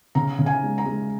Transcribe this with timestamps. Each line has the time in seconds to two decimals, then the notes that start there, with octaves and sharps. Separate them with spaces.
0.15 C#3 A#5
0.39 C#3
0.46 G#5
0.63 G#3
0.78 A#5
0.86 G#3